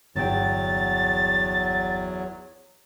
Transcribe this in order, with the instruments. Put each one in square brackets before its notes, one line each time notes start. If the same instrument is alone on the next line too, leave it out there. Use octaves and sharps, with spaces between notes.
[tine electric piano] G1 G5 [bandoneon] E2 F#3 [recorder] A6